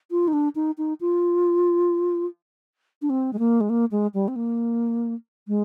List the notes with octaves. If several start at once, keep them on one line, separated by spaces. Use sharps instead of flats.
F4
D#4
D4
D#4
D#4
F4
D4
C4
G#3
A#3
G#3
A#3
G#3
G3
C4
A#3
G#3